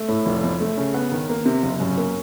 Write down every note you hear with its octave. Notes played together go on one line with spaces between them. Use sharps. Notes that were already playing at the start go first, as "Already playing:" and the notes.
Already playing: A3
A2
F1
F2
A3
C#3
B3
D#3
A#3
C3
F#1
F#2
A#3